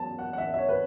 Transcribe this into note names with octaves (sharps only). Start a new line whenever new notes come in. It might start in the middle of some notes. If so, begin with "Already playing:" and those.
Already playing: F#3 B3 A5
F#5
F#5
E5
E5
C#5
B4